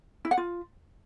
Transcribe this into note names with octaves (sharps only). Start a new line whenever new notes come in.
E4
F#5
F4